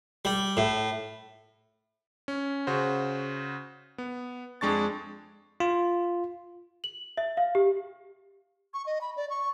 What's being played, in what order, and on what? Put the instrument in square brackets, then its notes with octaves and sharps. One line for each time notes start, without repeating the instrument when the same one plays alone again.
[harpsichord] G3
A2
[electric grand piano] C#4
C#3 F#4 C5
B3
F2 G#3 D4 C#6 A6
[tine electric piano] F4
[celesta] F#7
E5
F5
G4
[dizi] C#6
D#5
B5
D5
C#6